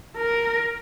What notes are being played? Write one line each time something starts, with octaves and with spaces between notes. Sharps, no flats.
A#4